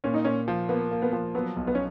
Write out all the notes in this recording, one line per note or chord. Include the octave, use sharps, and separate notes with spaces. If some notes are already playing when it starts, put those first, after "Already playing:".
A#2 C#4
D#4
A#2 C#4
F3
A#3 B3
A#3
B3
F3
F#3 B3
B1
B3
C#4